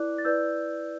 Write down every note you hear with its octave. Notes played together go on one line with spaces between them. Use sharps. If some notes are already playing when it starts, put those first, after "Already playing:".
Already playing: E4 B4 D5 D6 F#6
A6
E4 B4 D5 E6 G6